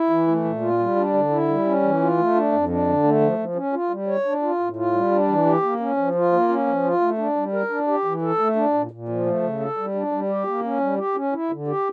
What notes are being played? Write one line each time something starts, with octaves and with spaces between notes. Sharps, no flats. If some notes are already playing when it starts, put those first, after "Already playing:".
Already playing: E4
E3
A3
A#2
F4
G3
D4
D3
E4
G3
C#4
E3
F4
A3
D4
F2
D4
D3
A3
F3
F3
C#4
F4
G3
C#5
D4
F4
A2
F4
G3
D4
E3
G4
A#3
C#4
F3
F4
A#3
C#4
F3
F4
A3
D4
G3
A#4
D4
G4
E3
A4
A3
D4
A#2
A#2
F3
A3
C#3
A4
G3
D4
G3
G4
A#3
C#4
G3
G4
C#4
E4
D3
G4